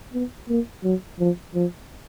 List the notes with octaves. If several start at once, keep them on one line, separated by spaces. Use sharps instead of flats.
B3
A#3
F#3
F3
F3